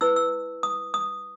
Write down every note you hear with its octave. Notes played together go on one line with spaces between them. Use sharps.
E4 B4 E6
E6
D#6
D#6